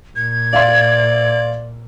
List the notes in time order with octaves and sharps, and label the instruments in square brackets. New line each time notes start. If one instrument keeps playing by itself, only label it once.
[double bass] A#2 [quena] G#6
[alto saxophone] D5 [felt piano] E5 F5 C6